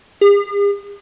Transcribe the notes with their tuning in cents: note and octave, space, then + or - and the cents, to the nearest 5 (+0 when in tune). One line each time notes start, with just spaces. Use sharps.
G#4 -45